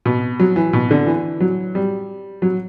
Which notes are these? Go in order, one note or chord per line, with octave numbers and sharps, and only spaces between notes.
B2
F#3
E3
B2
D3
E3
F#3
G3
F#3